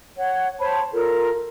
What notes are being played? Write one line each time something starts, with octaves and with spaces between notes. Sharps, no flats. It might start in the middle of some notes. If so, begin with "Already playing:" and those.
C#5 F#5
C5 C#5 A5 B5
F4 A4 A#4